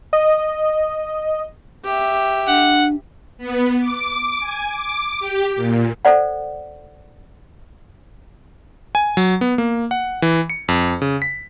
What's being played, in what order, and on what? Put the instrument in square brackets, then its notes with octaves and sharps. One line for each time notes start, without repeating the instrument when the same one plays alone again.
[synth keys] D#5
[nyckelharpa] G4 E5
[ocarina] D4 [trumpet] F#5
[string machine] B3
D6
G#5
D6
G4
A#2
[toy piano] A4 C5 D5 F#5
[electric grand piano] G#5
F#3
B3
A#3
F#5
E3
C#7
F2
C#3
B6